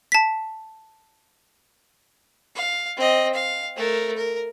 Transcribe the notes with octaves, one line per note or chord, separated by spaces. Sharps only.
A5 B6
F5
C4 D#5
F5
A3 A#4
A#4